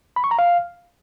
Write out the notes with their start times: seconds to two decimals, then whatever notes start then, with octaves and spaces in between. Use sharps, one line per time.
0.16 B5
0.24 C#6
0.31 A#5
0.39 F5